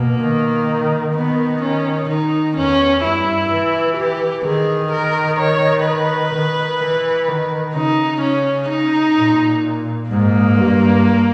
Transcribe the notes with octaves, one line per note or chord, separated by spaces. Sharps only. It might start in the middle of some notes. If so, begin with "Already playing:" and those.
Already playing: B2 A#3
D#3
D#3 B3
C#4
D#3 D#4
E2 C#4
G2 E4
E3
G4
D#3 G#4
A#4
C#5
B4
D#3
E3
D#3
C#3 D#4
C#4
D#4
A#2
G#2 A#3
G2